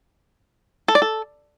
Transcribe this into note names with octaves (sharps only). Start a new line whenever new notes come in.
A4
D5
A4